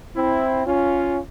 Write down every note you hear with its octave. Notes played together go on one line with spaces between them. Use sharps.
C4 E4
C#4 F4